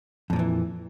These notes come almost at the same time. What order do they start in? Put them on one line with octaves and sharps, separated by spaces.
F2 A#2 F3 E3